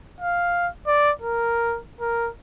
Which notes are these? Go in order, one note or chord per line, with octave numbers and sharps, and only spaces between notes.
F5
D5
A#4
A#4